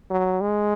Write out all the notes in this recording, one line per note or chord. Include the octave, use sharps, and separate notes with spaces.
F#3
G#3